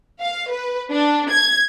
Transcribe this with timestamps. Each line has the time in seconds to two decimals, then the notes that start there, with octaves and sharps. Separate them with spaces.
0.21 F5
0.51 B4
0.91 D4
1.32 G#6